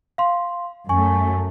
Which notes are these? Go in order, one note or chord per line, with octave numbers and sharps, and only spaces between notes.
F5 C6
F#2 A3 G#5 C#6